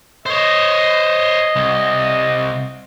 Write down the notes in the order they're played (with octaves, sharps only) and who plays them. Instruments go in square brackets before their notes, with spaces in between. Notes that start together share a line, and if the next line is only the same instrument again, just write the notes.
[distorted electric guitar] C5 C#5 [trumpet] D#5
[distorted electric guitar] C2